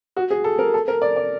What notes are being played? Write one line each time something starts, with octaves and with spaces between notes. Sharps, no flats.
F#4
G#4
A4
A#4
A4
A#4
D5
D5